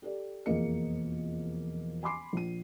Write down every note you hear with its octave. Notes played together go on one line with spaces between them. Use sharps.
G4 A4 D5
E1 F2 A#3 G#4 D#5 C#7
G#5 B5 C6 D6 C7
A#1 D#7